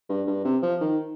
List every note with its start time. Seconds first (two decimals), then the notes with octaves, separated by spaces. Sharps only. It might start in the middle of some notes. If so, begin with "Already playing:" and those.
0.09 G2
0.27 G2
0.44 C3
0.62 F3
0.81 D#3